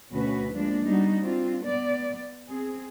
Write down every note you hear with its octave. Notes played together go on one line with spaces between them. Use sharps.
D2 B2 A3 C#4 F#4 B4
F3 G#3 A#3 D4
G3 B3 D4 D#4 F#4
C4 D4 F4
B3 D5
C4 G#4